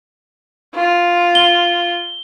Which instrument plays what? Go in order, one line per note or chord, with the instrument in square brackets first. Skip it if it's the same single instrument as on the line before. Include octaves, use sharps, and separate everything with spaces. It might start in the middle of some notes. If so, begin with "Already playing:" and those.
[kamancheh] F4
[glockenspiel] G7